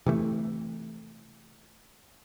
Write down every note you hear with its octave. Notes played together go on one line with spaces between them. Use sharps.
C3 E3 A3